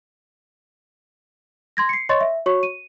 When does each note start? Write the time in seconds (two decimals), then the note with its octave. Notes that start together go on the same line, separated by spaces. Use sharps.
1.77 C6 G#6 A#6
1.89 C7 C#7
2.09 C#5 D#5 C6 C#6 A6
2.21 E5
2.46 F#4 C#5 C#6
2.63 D#7